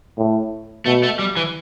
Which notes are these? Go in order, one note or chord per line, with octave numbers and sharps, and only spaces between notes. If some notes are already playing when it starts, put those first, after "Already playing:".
A2
B2 A3
A3
G3
E3